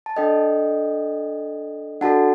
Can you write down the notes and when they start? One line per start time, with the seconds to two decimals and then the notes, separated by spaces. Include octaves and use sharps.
0.06 A5
0.17 D4 A4 D#5 G5
2.01 D4 F#4 A4 F#5 A5